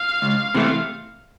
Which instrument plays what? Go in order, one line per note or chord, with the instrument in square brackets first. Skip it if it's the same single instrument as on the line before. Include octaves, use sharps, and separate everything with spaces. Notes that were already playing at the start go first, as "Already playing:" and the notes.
Already playing: [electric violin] F5
[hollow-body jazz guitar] C#2
C3 E3 A3